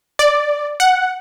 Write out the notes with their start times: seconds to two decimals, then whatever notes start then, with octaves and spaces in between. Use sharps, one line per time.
0.19 D5
0.80 F#5